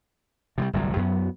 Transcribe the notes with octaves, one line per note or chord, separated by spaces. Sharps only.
C3 F#3 G3
G1 C2 A2 F#3
F#2 F#3 B3